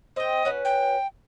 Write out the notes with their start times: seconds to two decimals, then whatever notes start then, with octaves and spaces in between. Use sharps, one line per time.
0.16 C4 D#5 G5
0.45 C#4 F#4 B4
0.65 G5